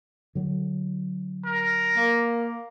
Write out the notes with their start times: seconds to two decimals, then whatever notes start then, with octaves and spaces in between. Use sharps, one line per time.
0.35 D3 F#3
1.45 A#4
1.96 A#3